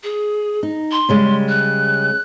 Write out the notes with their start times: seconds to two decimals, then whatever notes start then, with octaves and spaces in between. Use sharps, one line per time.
0.03 G#4
0.63 D#4
0.92 C6
1.09 C#3 G3 G#3
1.49 F#6